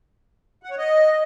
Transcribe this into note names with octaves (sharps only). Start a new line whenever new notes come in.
F#5
C#5
D#5